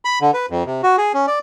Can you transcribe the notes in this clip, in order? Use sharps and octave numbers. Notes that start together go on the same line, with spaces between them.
B5
D3
B4
F2
C3
F#4
G#4
C#4
D5